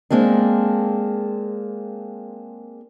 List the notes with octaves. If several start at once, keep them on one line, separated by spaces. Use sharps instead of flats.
G#3 A#3 C4 D4